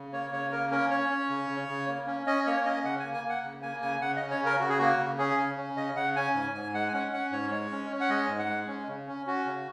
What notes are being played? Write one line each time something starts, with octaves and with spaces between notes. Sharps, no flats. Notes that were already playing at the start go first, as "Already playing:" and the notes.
Already playing: C#3
A#3 C#5
C#3 C#5
A#3 A#4
C#4 A#4
C#4 C#5
C#4
C#3
C#3
C#3
A#3
C#4
C#4 D#5
A#3 C#5
C#4 D#5
C#3 F#5
A#3 G#5
G#5
A#3
F#5
C#3
A#3 G#5
C#3 G#5
C#3 F#5
C#4 D#5
C#5
C#3
A#4
C#3 F#4
G#4
A#3 F#4
C#3
C#4 G#4
C#3
C#4
C#3 D#5
C#3 F#5
C#4 G#5
G#2 G#5
G#2 G#5
G#3 F#5
G#5
C#4 F#5
C#4 F#5
G#2 C#5
G#3 C#5
C#4
C#4
F#5
G#3 D#5
G#2
F#5
G#3
C#4
C#3
C#4
C#4 F#4
C#3